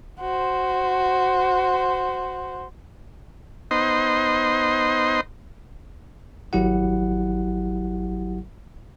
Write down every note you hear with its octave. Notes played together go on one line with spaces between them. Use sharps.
F#4 C5
B3 D#4 C5 D#5 C6
G#1 F#3 E4 G4 F#5